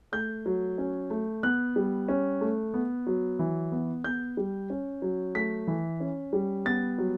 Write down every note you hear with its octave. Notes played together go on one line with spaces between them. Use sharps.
A3 G6
F#3
C#4
A3
B3 F#6
G3
C#4
A3
B3
F#3
E3
B3
B3 G6
G3
C#4
F#3
A3 B6
E3
C#4
G3
B3 A6
F#3